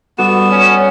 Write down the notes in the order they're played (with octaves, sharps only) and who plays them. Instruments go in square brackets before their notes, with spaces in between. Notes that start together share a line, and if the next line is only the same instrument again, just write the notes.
[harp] G3 F#4 A4 [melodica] B3 [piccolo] E7
[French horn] C#4